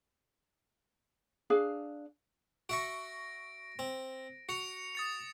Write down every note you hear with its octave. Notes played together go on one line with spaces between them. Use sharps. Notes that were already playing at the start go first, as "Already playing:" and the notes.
D4 G#4 F5
F#4 E5 C#6 A#6 D7
C4
F#4 C#7 F7
D#6 A6 C#7